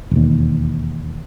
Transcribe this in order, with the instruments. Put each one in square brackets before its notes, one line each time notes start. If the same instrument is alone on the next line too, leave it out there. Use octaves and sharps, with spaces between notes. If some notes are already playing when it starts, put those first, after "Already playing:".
[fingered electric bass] E1 D#2